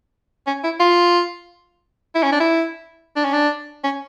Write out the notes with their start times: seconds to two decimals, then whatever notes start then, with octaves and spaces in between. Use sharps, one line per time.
0.47 C#4
0.63 E4
0.80 F4
2.15 E4
2.23 C#4
2.32 D4
2.40 E4
3.16 D4
3.24 C#4
3.33 D4
3.84 C#4